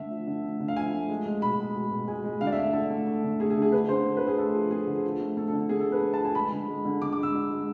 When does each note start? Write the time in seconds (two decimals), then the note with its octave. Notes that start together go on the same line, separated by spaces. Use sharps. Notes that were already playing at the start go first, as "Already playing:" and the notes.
Already playing: D3 A3 E5
0.10 F3
0.27 D3
0.44 A3
0.60 D3
0.68 F5
0.77 F3 G#5
0.93 A3
1.09 G#3
1.26 G#3
1.42 B2 B5
1.59 G#3
1.75 B2
1.91 B2
2.08 G#3 G#5
2.24 G#3
2.41 D3 F5
2.47 D5
2.52 E5
2.57 A3
2.73 D3 A4
2.90 A3
3.07 A3
3.24 D3
3.40 A3 G#4
3.50 G#4
3.56 D3
3.62 G#4
3.72 D3 B4
3.89 D3 C5
4.05 A3
4.17 B4
4.22 A3
4.28 G#4
4.38 A3 A4
4.55 F3
4.71 A3 G#4
4.87 D3
5.04 F3
5.20 A3
5.37 A3 A4
5.48 A4
5.53 D3
5.69 A3 G#4
5.80 A4
5.86 F3
5.92 B4
6.02 A3
6.14 A5
6.19 F3
6.25 G#5
6.35 G#3 B5
6.52 D3
6.68 G#3
6.85 D3
7.02 D3 D6
7.13 D6
7.17 G#3
7.23 E6
7.35 D3
7.50 G#3